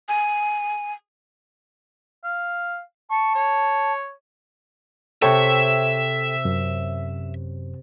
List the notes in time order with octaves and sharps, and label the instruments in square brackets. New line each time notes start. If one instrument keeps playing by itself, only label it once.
[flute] G#5
[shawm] F5
[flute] A5 [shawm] C#6
[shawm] C#5
[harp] C3 C#5 C#6 [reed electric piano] A4 G5 [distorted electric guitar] E5
[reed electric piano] F#2